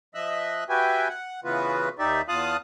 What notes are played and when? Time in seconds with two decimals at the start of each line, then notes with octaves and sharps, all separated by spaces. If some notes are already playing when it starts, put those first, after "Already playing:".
0.15 F3 D#5 E5 E6 F#6
0.69 F#4 G4 B4 E5 G5 G#5
1.09 F#5
1.44 C#3 E3 B3 F4 F#4 B4
1.99 D#2 D#4 G4 D5 E5
2.28 E2 F4 F5 A5 D#6 F#6